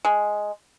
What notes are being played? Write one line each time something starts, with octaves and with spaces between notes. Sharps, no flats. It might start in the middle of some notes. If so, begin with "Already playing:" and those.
G#3